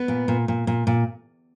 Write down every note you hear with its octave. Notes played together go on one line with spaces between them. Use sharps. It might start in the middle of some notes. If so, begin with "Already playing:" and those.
Already playing: B3 B4
A#2
A#2
A#2
A#2
A#2